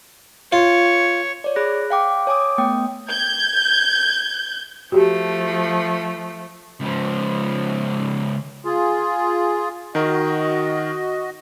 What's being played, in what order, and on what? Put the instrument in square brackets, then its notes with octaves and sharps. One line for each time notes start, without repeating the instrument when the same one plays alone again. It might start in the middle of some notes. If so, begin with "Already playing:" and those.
[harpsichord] F4 [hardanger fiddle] C#5
[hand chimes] C#5 D5
G#4 B5 F#6 A#6
F5 G5 D6
C#5 G#5 D6 D#6
A3 B3 G5 D#6
[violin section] G6 G#6
[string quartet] F3 A3 [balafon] F#4 G4
[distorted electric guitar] C#2 F3
[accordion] F4 G#4
[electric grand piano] D#3 A#4 [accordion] F#4 D#5